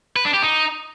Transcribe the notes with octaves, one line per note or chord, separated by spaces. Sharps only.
B4
D4
G4
D#4